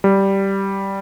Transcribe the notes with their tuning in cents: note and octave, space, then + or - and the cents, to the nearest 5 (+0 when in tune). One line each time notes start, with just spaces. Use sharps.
G3 -5